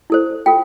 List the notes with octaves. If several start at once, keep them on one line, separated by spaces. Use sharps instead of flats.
E4 A4 C5
F4 A4 G5